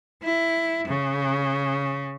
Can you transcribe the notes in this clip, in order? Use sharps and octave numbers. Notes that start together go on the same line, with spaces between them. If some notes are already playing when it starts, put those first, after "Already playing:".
E4
C#3